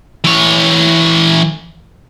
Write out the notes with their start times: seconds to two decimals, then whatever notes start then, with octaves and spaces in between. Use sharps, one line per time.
0.24 E3 C#5